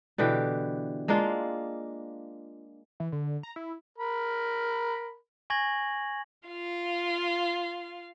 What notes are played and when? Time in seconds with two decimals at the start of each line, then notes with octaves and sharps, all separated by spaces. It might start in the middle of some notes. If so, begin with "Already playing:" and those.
0.18 B2 D3 E3 G4
1.08 G#3 A#3 D4 F4
3.00 E3
3.12 D3
3.43 A#5
3.56 E4
3.98 A#4 B5
5.50 G#5 C#6 G#6 A#6 F#7
6.49 F4 F5